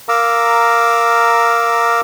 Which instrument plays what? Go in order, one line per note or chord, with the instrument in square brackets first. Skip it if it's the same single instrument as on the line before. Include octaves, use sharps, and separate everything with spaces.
[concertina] A#4 F5 A#5 D6 E6